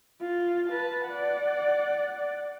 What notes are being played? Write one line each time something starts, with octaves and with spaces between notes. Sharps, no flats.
F4
B4 A5
D5 F#5